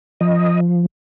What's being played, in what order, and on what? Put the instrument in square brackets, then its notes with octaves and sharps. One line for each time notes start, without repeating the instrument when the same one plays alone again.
[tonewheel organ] F3 D#5